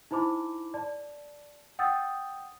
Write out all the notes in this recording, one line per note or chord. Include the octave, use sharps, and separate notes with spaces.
D#4 E4 C5 B5 D6
D5 A5
F#5 G5 D#6 E6 G6 A6